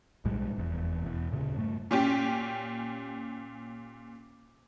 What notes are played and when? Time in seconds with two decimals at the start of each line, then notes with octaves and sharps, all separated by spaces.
0.25 B1 A2 G3 G#3
0.56 F1 E2
1.02 E1 E2
1.31 D1 A#2 C#3
1.56 G2 A3
1.91 A#2 C#4 G4